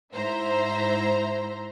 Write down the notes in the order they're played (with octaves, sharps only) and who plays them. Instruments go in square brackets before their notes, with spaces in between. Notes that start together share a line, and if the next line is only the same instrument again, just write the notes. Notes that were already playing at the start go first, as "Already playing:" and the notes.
[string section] G#2 E4 C5 E5 A#5 C6